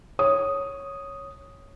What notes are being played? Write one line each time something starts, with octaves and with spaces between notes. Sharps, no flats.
C#5 D#6